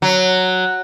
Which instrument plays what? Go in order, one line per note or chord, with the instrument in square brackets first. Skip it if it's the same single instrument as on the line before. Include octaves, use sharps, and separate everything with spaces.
[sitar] F#3